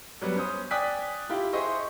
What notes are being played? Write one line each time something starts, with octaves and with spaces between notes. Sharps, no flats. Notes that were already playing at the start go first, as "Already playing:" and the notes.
F#3 G3 B3
C#4 C5 D#6
D5 G5 G#5 D#6 F#6 B6
E4 F4 G4
G#4 C5 D#5 E5 C6 C#6